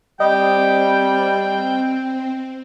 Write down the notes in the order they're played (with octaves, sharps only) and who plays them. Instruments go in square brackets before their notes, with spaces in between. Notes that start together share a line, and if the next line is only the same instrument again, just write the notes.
[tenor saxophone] G3 [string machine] C4 [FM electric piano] D#5 [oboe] G5